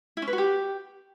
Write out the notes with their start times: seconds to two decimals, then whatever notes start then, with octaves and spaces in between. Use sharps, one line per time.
0.17 E4
0.22 C#4
0.27 B4
0.33 F#4
0.38 G4